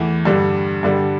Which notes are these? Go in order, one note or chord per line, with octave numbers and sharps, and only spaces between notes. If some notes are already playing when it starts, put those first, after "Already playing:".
Already playing: E2 E3 A3
G2 D3 G3
G2 D3 G3